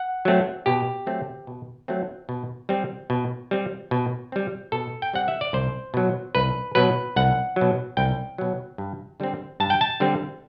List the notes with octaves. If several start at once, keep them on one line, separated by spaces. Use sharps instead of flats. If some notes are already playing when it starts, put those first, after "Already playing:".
Already playing: F#5
F#3 A3 C4
B2 G4
F#3 A3 C4
B2
F#3 A3 C4
B2
G3 C4
B2
G3 C4
B2
G3 C4
B2 A4
G5
G3 C4 F#5
E5
D5
C2 C5
B2 F#3
C2 B4
B2 F#3 B4
C2 F#5
F#3
B2
C2 G5
B2 F#3
G2
D3 G3 C4
G2 A5
G5
A5
D3 G3 C4